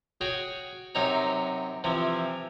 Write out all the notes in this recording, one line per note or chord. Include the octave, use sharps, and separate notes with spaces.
F#4 G#4 C#5 G5
F#2 C3 D#4 C#5 A#5
C3 E3 F3